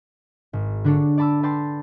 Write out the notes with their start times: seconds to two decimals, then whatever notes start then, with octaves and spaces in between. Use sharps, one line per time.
0.53 G#1
0.84 D3 D4 A4 C#5
1.18 D5 A5 B5 D6 E6
1.43 B4 D5 G5 A5 C6